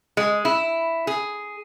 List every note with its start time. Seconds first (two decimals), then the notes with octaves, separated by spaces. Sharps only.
0.17 G#3
0.45 E4
1.07 G#4